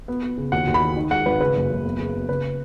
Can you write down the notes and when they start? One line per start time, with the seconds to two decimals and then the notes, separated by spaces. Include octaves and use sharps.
0.08 B3
0.23 B3
0.37 C#3
0.52 D#2 F#5
0.67 D#2
0.74 B5
0.81 D#3
0.97 D#3
1.11 G#3 F#5
1.26 G#1 B4
1.40 C#3 B4
1.55 F#1
1.70 F#1
1.85 B3
1.99 C#3
2.14 B3
2.29 C#3 B4